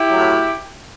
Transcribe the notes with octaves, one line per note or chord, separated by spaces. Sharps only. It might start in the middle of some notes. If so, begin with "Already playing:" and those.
Already playing: E4 G4
A2 F#3